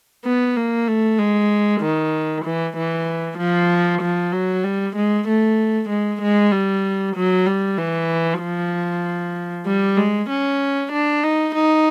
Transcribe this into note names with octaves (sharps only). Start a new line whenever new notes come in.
B3
A#3
A3
G#3
D#3
E3
E3
F3
F3
F#3
G3
G#3
A3
G#3
G#3
G3
F#3
G3
E3
F3
G3
G#3
C#4
D4
D#4
D#4